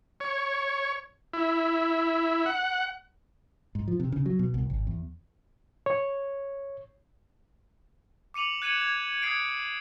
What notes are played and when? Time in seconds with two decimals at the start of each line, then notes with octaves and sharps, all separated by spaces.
0.20 C#5
1.33 E4
2.46 F#5
3.75 G#2
3.88 F3
4.00 C3
4.12 C#3
4.26 F#3
4.39 B2
4.54 C2
4.70 G#1
4.87 E2
5.86 C#5
8.34 D6 C#7 D#7 F7 F#7
8.62 F#6 G#6 C#7 D#7 E7 F#7
8.81 G#6
9.22 D#6 F#6 G#6 C7 D7